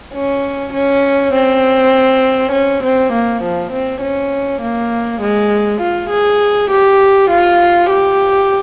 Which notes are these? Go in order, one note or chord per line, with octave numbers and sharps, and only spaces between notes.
C#4
C#4
C4
C#4
C4
A#3
F3
C4
C#4
A#3
G#3
F4
G#4
G4
F4
G4